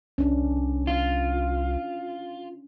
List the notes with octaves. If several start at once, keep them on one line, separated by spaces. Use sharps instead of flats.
C2 C#4 D4
F4